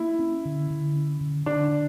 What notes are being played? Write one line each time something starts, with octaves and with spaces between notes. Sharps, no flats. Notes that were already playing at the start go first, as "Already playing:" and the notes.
Already playing: A#3 E4
C#4
D3
D3
C#4
D3
D3 D4
D3